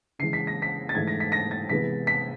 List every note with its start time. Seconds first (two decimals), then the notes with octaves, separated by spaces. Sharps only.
0.19 C#3 E3 G#3 C7
0.33 B6
0.47 A#6
0.62 B6
0.89 A6
0.95 G#2 E3 A3 G#6
1.07 A#6
1.20 B6
1.32 A#6
1.51 A6
1.69 C3 E3 G#3 B3 B6
2.07 B6